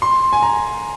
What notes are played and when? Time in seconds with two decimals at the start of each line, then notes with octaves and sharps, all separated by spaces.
0.02 C6
0.33 G#5
0.43 A#5